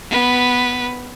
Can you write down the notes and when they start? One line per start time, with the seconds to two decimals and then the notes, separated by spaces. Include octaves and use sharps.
0.10 B3 B4